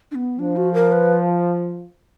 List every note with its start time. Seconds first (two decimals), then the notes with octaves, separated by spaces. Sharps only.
0.11 D4
0.15 B3
0.39 F3 D4
0.56 F#4
0.74 A#4
0.92 B4